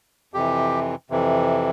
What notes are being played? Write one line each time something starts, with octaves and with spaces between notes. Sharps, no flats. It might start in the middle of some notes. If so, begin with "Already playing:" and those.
F2 C3 E3 G4
F2 C3 E3